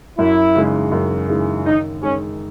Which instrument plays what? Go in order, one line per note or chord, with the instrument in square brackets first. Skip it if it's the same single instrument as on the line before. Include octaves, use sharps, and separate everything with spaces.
[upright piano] F#2 [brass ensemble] E4
[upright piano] C#3 E3 G#3 D#4
F#2
C#3 E3 G#3 D#4
[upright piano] D#3 [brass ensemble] D#4
[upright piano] G#3 D#4 [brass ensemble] C#4